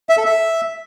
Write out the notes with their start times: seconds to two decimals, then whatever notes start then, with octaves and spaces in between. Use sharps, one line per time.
0.09 E5
0.17 A4
0.26 E5